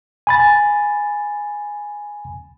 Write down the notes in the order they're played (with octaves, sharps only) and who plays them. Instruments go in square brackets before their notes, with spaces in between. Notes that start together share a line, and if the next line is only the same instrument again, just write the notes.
[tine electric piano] G#5 B5 A6